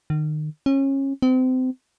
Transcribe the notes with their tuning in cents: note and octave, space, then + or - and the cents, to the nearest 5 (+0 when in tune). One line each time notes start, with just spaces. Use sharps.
D#3 -30
C#4 -25
C4 -30